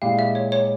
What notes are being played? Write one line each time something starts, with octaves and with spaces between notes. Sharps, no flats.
A#2 G#3 E4 G4 F5
E5
C#5
C#5